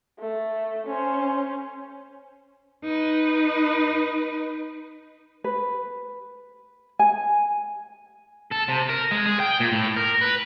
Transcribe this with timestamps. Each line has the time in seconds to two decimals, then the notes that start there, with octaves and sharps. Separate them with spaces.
0.19 A3
0.86 C#4 C5
2.84 D#4 B4
5.44 B4
6.99 G#5
8.51 A4
8.68 C3
8.89 A#4
9.11 G#3
9.26 G#4
9.40 G5
9.60 A#2
9.73 A2
9.97 A#4
10.21 B4